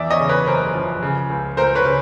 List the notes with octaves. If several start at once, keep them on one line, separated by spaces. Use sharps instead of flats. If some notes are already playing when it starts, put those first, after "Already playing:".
Already playing: E2 D5 E5
C#5 D#5
C#3
B4 C#5
F#1 A#4 C5
F3
C#3
C#2
C#2 A#4 C5
B4 C#5
C#3